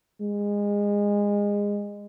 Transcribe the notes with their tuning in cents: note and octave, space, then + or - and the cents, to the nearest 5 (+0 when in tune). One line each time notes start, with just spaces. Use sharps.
G#3 -25